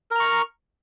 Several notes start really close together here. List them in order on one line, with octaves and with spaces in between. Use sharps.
A#4 A#5 C#6